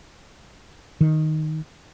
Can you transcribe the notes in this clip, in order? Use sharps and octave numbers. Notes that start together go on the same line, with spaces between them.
D#3